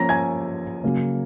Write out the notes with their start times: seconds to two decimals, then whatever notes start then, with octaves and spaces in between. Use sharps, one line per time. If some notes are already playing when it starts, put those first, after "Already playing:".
Already playing: F3 A#3 C#4 A#5 A#6
0.09 G#5 G#6
0.84 C#3 F#3 A#3 C#4